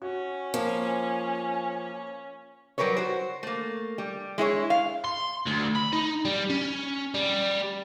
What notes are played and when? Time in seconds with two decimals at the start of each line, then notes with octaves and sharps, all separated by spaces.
0.02 C#4 F#4
0.54 F3 A#3 G#5
2.78 F#3 G3 A#4 B4 C#5
2.97 F#4 C5
3.43 A3 A#3
3.98 G3
4.38 G#3 E4 G#4 C#5
4.70 F5
5.04 C6
5.46 D2
5.75 B5
5.93 D#4
6.25 G3
6.50 C#4
7.15 G3